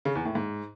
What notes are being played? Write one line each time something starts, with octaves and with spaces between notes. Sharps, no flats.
C#3
E2
A2
G#2